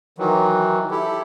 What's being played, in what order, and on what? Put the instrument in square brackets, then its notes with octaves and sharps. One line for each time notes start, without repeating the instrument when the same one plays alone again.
[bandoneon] D#3 E3 F#3
E4 G4 A4